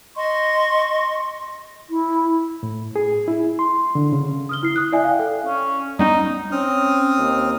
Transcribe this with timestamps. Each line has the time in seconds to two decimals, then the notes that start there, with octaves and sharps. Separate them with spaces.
0.15 D#5 C6 C#6
1.90 E4
2.63 A2
2.96 G#4
3.28 E4
3.59 C6
3.95 D3
4.13 C#3
4.49 D#6 F6 G7
4.63 E4 C7
4.76 D#6 F#6
4.92 E4 D5 E5 G#5
5.04 F5 G5
5.19 A4
5.46 C#4
5.99 G3 B3 C#4 D#4
6.52 C4 C#4 D#6 F6
7.18 D#2